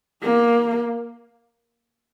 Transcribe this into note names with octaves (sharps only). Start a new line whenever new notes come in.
A#3